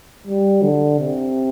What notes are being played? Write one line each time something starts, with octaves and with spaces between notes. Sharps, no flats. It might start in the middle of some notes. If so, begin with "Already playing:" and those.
G3
D3
C3